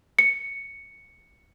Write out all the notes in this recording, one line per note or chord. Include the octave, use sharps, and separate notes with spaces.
C#7